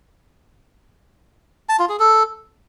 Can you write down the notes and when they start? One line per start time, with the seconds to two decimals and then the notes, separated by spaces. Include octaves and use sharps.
1.69 A5
1.79 F4
1.89 G#4
1.99 A4